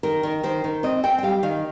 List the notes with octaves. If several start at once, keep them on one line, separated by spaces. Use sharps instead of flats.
D#3 A#4
D#3
D#3 C5
D#3
C4 D#5
C4 G5
G5
G3 F5
D#3 F5